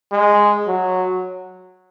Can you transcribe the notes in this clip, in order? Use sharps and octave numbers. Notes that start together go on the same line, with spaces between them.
G#3
F#3